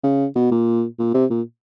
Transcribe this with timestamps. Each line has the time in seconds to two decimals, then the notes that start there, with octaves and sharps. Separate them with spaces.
0.04 C#3
0.35 B2
0.51 A#2
0.99 A#2
1.14 C3
1.30 A#2